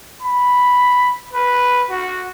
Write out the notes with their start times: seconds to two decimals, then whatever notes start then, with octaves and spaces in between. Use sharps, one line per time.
0.22 B5
1.33 B4
1.90 F#4